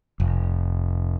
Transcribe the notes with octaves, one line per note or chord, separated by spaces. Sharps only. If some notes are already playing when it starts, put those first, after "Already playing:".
F1